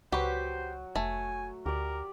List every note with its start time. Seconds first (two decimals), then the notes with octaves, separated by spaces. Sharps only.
0.12 C#2 F#3 G4 B4 C5
0.96 F1 A3 G#5
1.66 D2 G4 A#4 D5